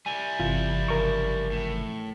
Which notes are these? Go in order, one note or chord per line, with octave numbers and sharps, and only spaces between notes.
G3 E4 G#5
G1 C3 E3 F4
C#3 F3 A#4 C#6
A2